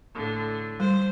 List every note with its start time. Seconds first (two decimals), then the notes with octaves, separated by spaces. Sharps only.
0.14 A2 D3
0.80 G3 C5